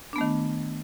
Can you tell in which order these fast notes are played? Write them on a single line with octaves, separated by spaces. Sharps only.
D4 B3 A3 D#3